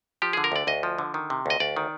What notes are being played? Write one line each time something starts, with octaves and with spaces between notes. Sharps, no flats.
F3 G4
D3 G#4
A#4
D2 D5
D2 D#5
F3
D3
D#3
C3
D2 D#5
D2 D5
D#3